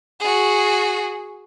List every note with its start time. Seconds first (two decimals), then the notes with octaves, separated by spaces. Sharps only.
0.20 F#4 G#4